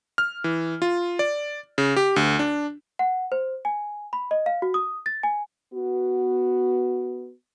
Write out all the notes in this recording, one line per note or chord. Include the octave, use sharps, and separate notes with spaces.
F6
E3
F4
D5
C#3
G4
D2
D4
F#5
C5
G#5
B5
D#5
F5
F#4
D#6
A6
G#5
B3 F#4